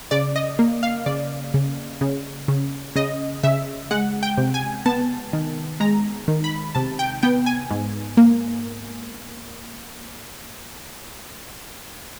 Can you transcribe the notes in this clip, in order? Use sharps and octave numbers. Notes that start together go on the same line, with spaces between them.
C#3 D5
D#5
A#3
F5
C#3 D5
C#3
C#3
C#3
C#3 D#5
C#3 E5
G#3 F#5
G5
C3
G#5
B3 A5
D#3
G#3 A#5
D#3
B5
C3 A5
G5
B3 G5
G#5
G#2
A#3